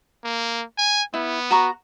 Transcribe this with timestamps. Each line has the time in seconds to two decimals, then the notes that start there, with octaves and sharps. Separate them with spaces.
0.24 A#3
0.78 G#5
1.14 B3 E4
1.51 F#4 A#5 C#6